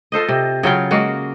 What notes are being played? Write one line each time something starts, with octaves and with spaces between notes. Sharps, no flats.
F4 A4 C5 D#5
C3
C#3 F#3 F4 G5
G#3 A#3 F#4